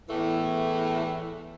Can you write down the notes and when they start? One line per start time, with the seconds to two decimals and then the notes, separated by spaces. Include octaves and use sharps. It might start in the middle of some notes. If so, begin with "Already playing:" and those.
0.09 E2 A2 E3 A3